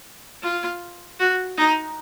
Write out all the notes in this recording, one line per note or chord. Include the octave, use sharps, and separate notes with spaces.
F4
F#4
D#4